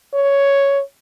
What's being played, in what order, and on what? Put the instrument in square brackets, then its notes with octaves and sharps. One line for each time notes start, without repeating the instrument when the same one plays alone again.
[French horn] C#5